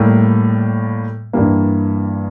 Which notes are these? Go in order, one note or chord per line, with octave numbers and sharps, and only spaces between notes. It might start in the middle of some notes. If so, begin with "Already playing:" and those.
Already playing: A2 G3 A#3
G2 E3 G3 A#3